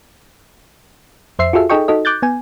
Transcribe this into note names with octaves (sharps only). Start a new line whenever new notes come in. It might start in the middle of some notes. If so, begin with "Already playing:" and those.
F2 C5 E5 C7
F4 F#4 G#4 A4 E5
D#4 G#4 A4 D#5 G5 C#6
D#4 F#4 A4 D#5
D6 F#6 G6 A6
B3 G#5